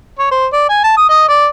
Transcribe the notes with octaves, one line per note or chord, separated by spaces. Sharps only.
C#5
C5
D5
G#5
A5
D#6
D#5
D5